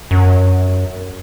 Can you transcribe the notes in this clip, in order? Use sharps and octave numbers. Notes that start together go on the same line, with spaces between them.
F#2